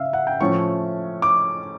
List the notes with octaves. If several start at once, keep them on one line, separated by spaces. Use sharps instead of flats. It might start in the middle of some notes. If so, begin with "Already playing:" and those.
Already playing: C#3 E5 F5
F#5
G5
A2 F3 A3 C#4 C#6
D6